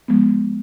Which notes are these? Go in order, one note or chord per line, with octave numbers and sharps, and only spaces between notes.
F3 G#3 B3